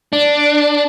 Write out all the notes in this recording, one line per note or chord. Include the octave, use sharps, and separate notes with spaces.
D4